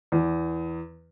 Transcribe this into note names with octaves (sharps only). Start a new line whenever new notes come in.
E2